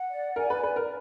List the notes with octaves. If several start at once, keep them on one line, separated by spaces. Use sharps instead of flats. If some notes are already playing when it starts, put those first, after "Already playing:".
Already playing: F#5
D5
A#4 G#5
B4
B4 D5
A#4